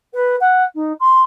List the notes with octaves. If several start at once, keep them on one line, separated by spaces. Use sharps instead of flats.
B4
F#5
D#4
C6